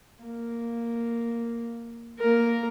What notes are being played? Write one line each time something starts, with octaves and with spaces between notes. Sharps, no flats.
A#3
A#3 A#4